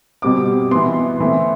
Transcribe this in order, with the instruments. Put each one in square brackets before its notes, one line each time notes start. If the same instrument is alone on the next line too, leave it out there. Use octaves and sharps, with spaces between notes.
[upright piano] B2 G3 C4 D6
E3 B3 C6
E3 A3 C4